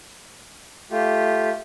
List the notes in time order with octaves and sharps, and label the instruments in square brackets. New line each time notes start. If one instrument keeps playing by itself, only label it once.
[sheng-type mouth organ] A3 F4 G4